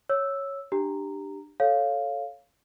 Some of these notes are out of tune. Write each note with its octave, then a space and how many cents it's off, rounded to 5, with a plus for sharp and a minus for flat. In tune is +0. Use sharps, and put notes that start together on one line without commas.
C#5 -5 E6 +0
D4 +25 G4 +0 A#5 -10
A4 +0 C#5 +0 F5 +0